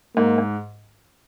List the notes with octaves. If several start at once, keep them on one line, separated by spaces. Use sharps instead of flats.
G#2 A#3
G#2